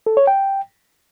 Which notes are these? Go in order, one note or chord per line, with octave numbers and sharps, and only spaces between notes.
A4
C#5
G5